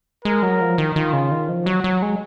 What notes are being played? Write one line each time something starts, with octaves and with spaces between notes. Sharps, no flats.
G#3 A#4
F#3
F3
D#3
D#3 F4
C#3
D#3
F3
F#3 F#4
F#3
G#3